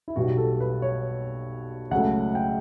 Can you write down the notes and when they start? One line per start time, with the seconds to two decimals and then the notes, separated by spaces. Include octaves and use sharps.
0.08 E4
0.16 B1 B2 G3 F#4
0.37 A4
0.60 B4
0.82 C#5
1.91 C#2 C#3 F#3 A3 F#5
2.35 G5